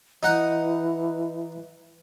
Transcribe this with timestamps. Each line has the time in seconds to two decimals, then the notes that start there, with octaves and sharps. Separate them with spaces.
0.23 E3 D#4 F#5